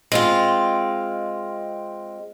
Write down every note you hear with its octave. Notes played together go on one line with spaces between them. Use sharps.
G#3 C4 F4